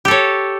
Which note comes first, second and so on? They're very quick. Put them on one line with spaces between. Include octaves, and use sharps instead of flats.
G4 A4 C#5